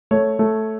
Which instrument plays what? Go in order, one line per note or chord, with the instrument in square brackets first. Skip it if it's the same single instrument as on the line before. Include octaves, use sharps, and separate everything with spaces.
[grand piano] A3 C#5
A3